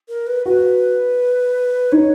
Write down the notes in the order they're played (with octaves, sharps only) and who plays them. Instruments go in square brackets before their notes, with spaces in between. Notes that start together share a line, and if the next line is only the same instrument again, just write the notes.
[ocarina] A#4
B4
[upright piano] F#4 [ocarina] B4
[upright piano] D#4 [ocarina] C#5